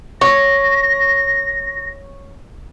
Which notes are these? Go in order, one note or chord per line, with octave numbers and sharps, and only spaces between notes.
C#5 A#6